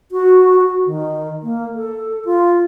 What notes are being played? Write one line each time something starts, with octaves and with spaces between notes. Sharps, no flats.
F#4
F#4
D#3
A#3
A4
F4